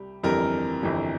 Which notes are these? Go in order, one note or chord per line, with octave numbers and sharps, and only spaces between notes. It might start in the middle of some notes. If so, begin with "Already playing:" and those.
Already playing: C2 G3
G1 F2 E3 G3 A#4 A#5
G1 F2 E3 G3